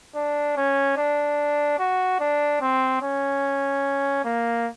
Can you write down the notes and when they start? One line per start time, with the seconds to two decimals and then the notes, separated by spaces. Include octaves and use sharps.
0.15 D4
0.57 C#4
0.97 D4
1.79 F#4
2.20 D4
2.61 C4
3.02 C#4
4.25 A#3